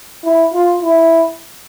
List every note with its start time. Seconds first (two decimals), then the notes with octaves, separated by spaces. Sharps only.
0.24 E4
0.54 F4
0.82 E4